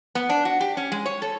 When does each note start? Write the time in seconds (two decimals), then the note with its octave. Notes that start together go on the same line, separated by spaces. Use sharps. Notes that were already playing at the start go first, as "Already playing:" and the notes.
0.15 B3
0.29 D4
0.45 F#4
0.60 G4
0.77 C#4
0.92 G#3
1.05 C#5
1.22 A4